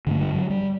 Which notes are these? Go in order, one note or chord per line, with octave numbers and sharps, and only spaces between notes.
G2 D3 A3
G3
F#3
G3